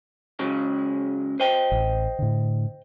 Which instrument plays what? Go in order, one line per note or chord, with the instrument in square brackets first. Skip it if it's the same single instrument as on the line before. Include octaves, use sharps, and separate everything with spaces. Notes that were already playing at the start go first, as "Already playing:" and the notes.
[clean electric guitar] C#3 F#3 G#3
C5 D#5 G5
[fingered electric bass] A1
A2 D3